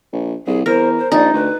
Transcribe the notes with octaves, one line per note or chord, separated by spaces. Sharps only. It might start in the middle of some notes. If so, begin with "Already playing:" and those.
A#1
C2 G#4
E2 A#4 C5
C5
A#1 D#4 D5
D2 B4